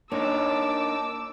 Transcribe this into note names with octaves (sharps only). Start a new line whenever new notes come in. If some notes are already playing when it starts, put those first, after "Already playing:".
A#3 D4 D#4 C#5 A5 D6 E6